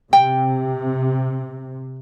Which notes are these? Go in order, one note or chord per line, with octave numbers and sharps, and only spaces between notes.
C3 G5